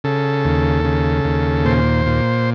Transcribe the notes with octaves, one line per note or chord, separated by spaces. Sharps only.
C#3 A4
D#2
C#3
D#2
A#2 C5
A#2